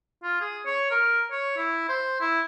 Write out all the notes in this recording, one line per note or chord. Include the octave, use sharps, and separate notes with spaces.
F4
G#4
C#5
A#4
C#5
E4
C5
E4